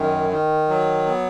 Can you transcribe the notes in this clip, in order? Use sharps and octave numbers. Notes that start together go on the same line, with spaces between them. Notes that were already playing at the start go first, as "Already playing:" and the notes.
Already playing: F#2 D#3
D#3
F#3
B3